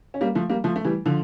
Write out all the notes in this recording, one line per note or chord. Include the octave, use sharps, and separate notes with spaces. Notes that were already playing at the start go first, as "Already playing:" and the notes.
C#4
G3 A#3
F3 A3
G3 A#3
F3 A3
A3
E3 G3
D3 F3